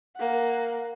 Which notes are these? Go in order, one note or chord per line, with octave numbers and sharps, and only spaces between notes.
A#3 F#5